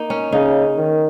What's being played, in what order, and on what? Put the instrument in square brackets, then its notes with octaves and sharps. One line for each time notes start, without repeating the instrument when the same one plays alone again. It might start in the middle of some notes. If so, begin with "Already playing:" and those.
Already playing: [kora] A#3 D#4
C#4
[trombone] C#3 [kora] D#4
[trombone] D#3